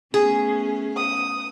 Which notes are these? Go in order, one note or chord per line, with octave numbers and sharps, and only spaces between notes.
A3 B3 C#4 G#4
D#6